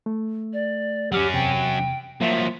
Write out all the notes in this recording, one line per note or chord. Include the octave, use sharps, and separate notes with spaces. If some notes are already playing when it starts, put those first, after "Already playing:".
A3
D5
D2 F#3 C#4 G4 F6
E2 C3 G5
F3 F#3 A#3 E5